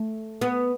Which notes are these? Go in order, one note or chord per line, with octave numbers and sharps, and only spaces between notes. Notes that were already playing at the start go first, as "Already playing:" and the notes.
Already playing: A3
B3